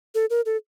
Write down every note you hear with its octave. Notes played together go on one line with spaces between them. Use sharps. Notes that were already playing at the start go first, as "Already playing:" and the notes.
A4
A#4
A4